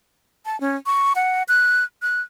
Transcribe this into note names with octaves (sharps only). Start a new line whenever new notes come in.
A5
C#4
C#6
F#5
F#6
F#6